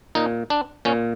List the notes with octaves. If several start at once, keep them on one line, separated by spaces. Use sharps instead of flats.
A#2 D#4
D4
A#2 C#4